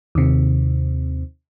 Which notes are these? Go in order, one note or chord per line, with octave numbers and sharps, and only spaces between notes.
D#2 C3